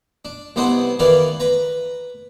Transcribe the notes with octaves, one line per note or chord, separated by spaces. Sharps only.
D4
C2 B3 D4 C5 D#5 F#5
D#3 E3 A#4 B4 D5 F5
B4 A#5